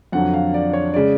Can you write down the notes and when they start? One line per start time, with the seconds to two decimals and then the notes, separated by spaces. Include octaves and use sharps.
0.12 F2 D3 F#3 F#5
0.34 F5
0.54 D5
0.73 C#5
0.94 C#3 G#3 D5